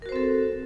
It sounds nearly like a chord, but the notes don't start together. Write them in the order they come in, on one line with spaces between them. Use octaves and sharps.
A#4 F#4 C5 C4 A4